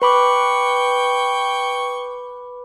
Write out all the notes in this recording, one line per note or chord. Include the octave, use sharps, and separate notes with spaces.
B4 G5 B5 C#6 D6